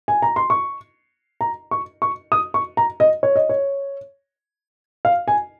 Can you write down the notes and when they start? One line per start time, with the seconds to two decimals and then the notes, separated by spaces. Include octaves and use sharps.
0.08 G#5
0.22 A#5
0.36 C6
0.50 C#6
1.41 A#5
1.71 C#6
2.02 C#6
2.32 D#6
2.54 C#6
2.77 A#5
3.00 D#5
3.23 C#5
3.36 D#5
3.49 C#5
5.05 F5
5.28 G#5